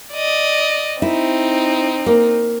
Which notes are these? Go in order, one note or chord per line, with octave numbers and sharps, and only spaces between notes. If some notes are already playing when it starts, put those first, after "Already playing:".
D5 D#5
C4 D#4 E4
A#3